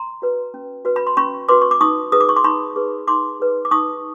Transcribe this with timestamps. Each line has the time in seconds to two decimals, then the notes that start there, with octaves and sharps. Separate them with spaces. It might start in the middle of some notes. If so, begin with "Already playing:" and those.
Already playing: A#5 C6
0.22 F#4 B4
0.54 C#4
0.85 F#4 B4
0.96 B5
1.07 C6
1.17 C#4 B5 C#6
1.49 F#4 B4 C6 D6
1.62 C#6
1.71 D6
1.81 D#4 C#6 D#6
2.12 G#4 B4 D#6
2.20 D6
2.29 C#6
2.36 C6 D6
2.44 D#4 B5 C#6
2.76 G#4 B4
3.08 D#4 C6 D6
3.40 G#4 B4
3.65 D6
3.71 D#4 C#6 D#6